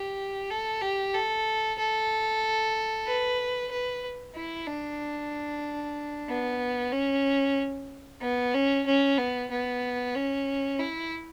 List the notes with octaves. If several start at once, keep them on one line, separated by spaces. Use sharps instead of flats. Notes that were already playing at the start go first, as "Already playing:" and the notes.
Already playing: G4
A4
G4
A4
A4
B4
B4
E4
D4
B3
C#4
B3
C#4
C#4
B3
B3
C#4
E4